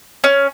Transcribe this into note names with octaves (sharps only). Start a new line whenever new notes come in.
C#4